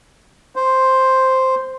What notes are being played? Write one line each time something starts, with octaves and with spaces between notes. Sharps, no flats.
C5